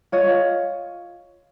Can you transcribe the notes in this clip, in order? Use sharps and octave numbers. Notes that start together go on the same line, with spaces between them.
F4 C#5 D#5